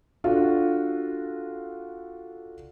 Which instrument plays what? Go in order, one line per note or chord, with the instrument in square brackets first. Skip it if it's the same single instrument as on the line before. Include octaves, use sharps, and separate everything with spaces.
[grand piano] D4 F4 F#4 A4